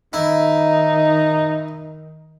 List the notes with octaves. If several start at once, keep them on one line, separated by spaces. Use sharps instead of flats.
D#3 D#4 E4